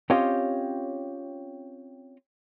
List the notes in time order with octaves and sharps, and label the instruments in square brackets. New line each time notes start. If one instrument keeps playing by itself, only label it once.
[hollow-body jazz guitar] C4 C#4 F4 G4 C#5 D#5